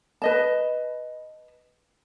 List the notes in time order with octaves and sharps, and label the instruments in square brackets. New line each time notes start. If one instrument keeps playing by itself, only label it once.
[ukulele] B4 D#5 A5